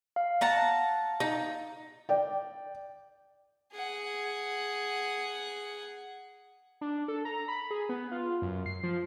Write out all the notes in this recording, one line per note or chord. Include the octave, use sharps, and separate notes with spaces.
F5
F#5 A5 A#5
D#4
D5 G5
G#4 F#5
D4
A4
A#5
B5
G#4
B3
F4
F#2
C7
F3